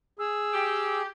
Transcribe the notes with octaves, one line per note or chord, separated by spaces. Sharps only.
G#4 E6
G4